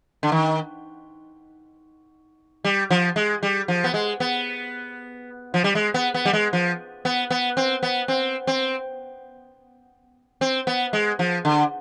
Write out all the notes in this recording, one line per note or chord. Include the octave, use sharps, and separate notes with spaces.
D3
D#3
G3
F3
G#3
G3
F3
B3
G#3
B3
F3
G3
G#3
B3
B3
G3
G#3
F3
B3
B3
C4
B3
C4
C4
C4
B3
G#3
F3
D3